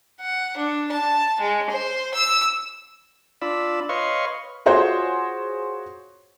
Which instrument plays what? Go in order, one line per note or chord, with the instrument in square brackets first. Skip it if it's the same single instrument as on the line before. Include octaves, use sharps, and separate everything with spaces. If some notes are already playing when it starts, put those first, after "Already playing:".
[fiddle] F#5
D4
A5
G#3
C5
E6
[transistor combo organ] D4 F4 D5 B5 E6
B4 C#5 D#5 F5 C6 C#6
[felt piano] F4 F#4 G#4 C5 C#5